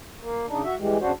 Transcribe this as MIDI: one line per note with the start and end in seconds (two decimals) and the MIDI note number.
0.21 0.46 58
0.48 0.62 49
0.48 0.62 62
0.48 0.62 63
0.64 0.75 66
0.64 0.75 76
0.78 0.98 52
0.78 0.98 55
0.78 0.98 56
1.00 1.12 40
1.00 1.12 49
1.00 1.12 62
1.00 1.12 66
1.00 1.12 72